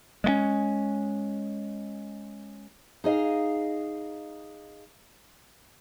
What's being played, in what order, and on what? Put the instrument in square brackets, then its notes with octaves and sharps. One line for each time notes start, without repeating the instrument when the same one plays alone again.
[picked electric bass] G#3 A3 C#4
[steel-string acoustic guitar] D#4 G#4 D#5 F5